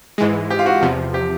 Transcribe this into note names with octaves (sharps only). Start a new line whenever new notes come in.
G#2 E3 G#3
G4
F4
F#4
E2 C3 F3
G4